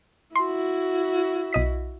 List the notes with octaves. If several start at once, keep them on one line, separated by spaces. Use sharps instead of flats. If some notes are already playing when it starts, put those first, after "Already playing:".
E4 F#4 C6
B1 D#5 B6